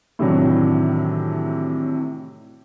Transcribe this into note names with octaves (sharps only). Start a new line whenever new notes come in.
A2 C3 D#3 E3 F#3 D4